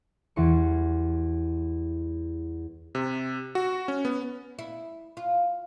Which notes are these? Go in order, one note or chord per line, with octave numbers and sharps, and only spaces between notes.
E2 E3 G3 C6 C#6
C3
F#4
C#4
B3
E4
F4